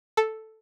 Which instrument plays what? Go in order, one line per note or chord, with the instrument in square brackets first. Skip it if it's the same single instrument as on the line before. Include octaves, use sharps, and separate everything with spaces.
[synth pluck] A4